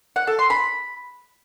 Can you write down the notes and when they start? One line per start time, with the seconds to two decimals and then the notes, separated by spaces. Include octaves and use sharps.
0.16 F#5
0.27 A4
0.39 C6
0.50 B5